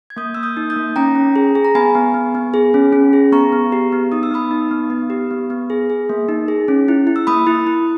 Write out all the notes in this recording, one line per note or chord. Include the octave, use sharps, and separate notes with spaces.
G#6
A#3 D#6 G6
A#3 E6
D#6 G6
D#4
D#6 G6
A#3
C#4 G5 A#5
C#4
G#4
G#4
A#5
B3 G#5 B5
B3
B3
B3
G#4
C#4
C#4
G#4
B3 A#5 C#6
B3
G4
B3
D#4 D#6
E6
B3 B5 D#6
D#4
B3
B3
G4
B3
B3
G#4
G#4
A#3
D#4
G#4
C#4
E4
E4
E6
A#3 B5 D#6
E4
E4